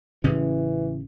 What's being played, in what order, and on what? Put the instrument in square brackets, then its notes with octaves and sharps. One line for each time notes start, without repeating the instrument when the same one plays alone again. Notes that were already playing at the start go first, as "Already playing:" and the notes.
[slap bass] A1 C#3 C#4 [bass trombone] E3